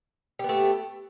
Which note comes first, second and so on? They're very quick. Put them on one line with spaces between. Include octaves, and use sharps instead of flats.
G4 B3 A3